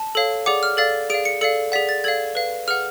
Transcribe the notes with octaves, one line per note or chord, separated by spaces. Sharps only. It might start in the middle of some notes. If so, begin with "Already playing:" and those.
Already playing: A5
A4 C#5 F5
G#4 D5 F#5 D6
F6
A4 D5 F5 A6
G#4 D5 F5 D7
C#7
A4 D5 F5 C#7
G#4 D5 F#5 B6
A6
A4 D5 F5 G#6
B4 F5
G#4 B4 F#5 F6